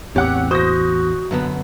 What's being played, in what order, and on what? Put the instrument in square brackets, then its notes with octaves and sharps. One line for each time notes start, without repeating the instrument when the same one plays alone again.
[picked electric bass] A1 E2 [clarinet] C4 [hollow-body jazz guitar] G4 [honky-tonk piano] C#5 F#5 D6
[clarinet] F#4 [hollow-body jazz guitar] C5 [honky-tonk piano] D#6 G6 A#6
[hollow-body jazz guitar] F#2 D3 B3